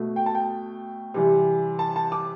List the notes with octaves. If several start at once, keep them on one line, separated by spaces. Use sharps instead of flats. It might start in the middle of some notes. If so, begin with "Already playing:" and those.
Already playing: B2 A3
G5
A5
G5
C3 E3 G3
A5
A5
D6